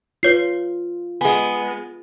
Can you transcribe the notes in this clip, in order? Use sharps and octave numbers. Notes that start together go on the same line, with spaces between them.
F4 B4 C#5 C7
G#3 B3 G#4 G#5